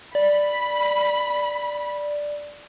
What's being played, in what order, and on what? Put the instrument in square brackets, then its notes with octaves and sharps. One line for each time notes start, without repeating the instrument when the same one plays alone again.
[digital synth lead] D5 [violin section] B5